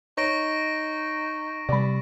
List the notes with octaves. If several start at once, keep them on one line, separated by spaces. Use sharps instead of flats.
D#4 C#5 C#6 A#6 D7
C3 G3 D5 B5